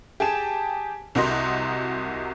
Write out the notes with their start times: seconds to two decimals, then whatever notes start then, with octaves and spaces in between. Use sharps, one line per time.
0.20 G4 G#4 A5 E7
1.15 C2 C3 F#4 A#4 D#5 C6